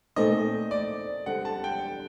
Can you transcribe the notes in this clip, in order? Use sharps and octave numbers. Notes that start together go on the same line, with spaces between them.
A#2 A3 C4 D#4 D#5
D5
D3 G3 C4 F#5
A5
G5